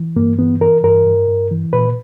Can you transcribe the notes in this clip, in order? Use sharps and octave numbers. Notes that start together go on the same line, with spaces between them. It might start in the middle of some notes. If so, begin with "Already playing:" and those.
Already playing: E3
G2 A#3
E3 B3
E3 A#4
G2 A#4
G2
G2
E3
A#2 B4